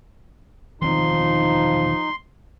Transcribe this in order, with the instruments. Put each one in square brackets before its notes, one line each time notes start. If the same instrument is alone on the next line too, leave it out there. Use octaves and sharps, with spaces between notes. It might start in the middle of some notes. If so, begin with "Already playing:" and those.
[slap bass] E1 D#3 C4 [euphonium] F3 [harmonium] D#4 [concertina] C6